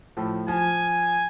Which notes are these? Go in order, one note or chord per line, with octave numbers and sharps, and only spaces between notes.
A2 F3
F3 G#5